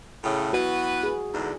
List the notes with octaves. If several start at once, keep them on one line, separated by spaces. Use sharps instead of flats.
A2 C#3
E3 B3 F#4 B4
G#4
E2 G#2 D3